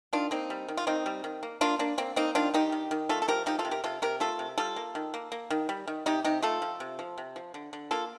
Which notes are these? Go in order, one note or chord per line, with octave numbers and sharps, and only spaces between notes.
D#3 D4 F4
A#3 C4 D#4
G3
D#3
F4
D#3 C4 D#4
G3
D#3
A#3
A#3 D4 F4
A#3 D4
A#3 C4
A#3 C4 D#4
D#3 D4 F4
D#3 D#4 G4
D#3
D#3
A3 F4 A4
A4
F3 G4 A#4
F3 D#4 G4
F4 A4
C3
G4 A#4
C3 F4 A4
C3 G4 A#4
A3 F4 A4
C3
G3 F4 A4
A#3
D#3
A#3
A#3
D#3
G3
D#3
C3 D#4 G4
C3 D#4 G4
A3 F4 A4
F3
C3
F3
C3
F3
D3
D3
A#3 F4 A4